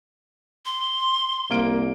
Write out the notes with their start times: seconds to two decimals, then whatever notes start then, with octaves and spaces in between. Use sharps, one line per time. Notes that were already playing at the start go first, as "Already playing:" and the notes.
0.65 C6
1.50 C2 A#3 D7